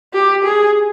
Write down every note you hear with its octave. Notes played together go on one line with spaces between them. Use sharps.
G4
G#4